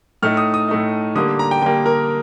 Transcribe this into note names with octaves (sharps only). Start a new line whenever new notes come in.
A2 A3 D#4 F6
D#6
D#6
A2 A3 D#4
D3 G3 A#3 D#6
A#5
G5
D3 G3 A#3 G5
A#4